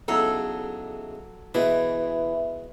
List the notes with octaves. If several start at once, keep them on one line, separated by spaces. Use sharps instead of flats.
E2 G#2 C#3 F#3 A4
B2 E3 G#3 E4